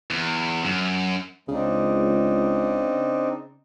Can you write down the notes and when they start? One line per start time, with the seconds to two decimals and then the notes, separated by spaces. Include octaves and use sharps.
0.11 E2
0.65 F#2
1.48 C#2 C#3 C4 D4 D#4